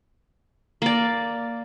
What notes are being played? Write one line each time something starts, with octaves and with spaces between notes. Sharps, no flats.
A#3 D5